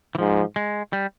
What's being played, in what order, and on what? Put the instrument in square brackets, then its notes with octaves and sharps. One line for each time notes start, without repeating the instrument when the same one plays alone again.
[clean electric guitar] E3
[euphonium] G#2 [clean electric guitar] F3
[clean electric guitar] G#3
G3